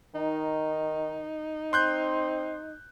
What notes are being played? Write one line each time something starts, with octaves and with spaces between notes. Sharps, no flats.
D#3 D#4
C4 C6 F#6 G6